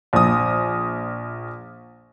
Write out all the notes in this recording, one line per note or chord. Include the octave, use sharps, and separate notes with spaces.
A#1 D#6